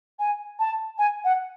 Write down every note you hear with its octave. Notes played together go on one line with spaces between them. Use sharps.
G#5
A5
G#5
F#5